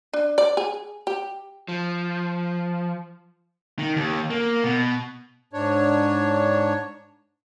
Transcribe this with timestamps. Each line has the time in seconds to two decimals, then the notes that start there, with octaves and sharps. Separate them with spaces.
0.13 D4
0.38 D5
0.57 G#4
1.07 G4
1.68 F3
3.79 D#3
3.96 D#2
4.30 A#3
4.64 B2
5.53 G#2 D4 C#5